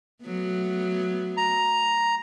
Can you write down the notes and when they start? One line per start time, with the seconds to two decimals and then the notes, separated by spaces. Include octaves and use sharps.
0.24 F#3 A3 B3
1.37 A#5